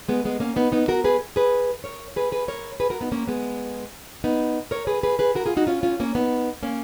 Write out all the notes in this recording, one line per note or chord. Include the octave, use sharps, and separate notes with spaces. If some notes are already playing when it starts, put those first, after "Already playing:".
G#3 B3
G#3 B3
A#3 C#4
B3 D#4
B3 D#4
F#4 A#4
G#4 B4
G#4 B4
A#4 C#5
G#4 B4
G#4 B4
A#4 C#5
G#4 B4
F#4 A#4
B3 D#4
A#3 C#4
G#3 B3
B3 D#4
A#4 C#5
G#4 B4
G#4 B4
G#4 B4
F#4 A#4
F4 G#4
D#4 F#4
C#4 F4
C#4 F4
A#3 C#4
B3 D#4
A#3 C#4